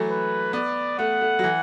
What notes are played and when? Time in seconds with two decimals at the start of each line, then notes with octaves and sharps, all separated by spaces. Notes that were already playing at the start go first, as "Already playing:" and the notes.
Already playing: E3 F#3 A3
0.09 B4
0.53 B3 D5
0.99 A3 F#5
1.21 A3
1.39 F#3
1.44 E3